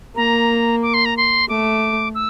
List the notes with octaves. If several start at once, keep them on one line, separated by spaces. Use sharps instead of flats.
A#3 A#5
D6
C6
A#5
C6
A3 D6
E6